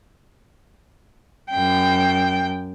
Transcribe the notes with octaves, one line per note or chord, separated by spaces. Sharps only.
F#2 G5